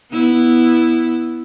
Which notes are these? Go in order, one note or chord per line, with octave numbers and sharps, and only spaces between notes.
B3 E4